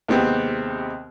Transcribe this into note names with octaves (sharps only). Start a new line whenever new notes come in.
D#2 C3 G#3 B3 C4